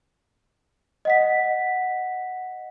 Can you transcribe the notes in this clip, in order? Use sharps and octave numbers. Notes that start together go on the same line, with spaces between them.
D#5 F#5 B6